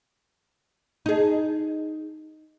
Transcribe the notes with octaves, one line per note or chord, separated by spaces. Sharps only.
D#4 G#4